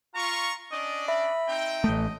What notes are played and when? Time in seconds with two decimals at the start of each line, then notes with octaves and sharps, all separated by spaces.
0.15 F4 A#5 C#6
0.72 C#4 D4 D5 D#5
1.08 E5 B5
1.48 C4 D#4 G5
1.84 A1 A3 D#5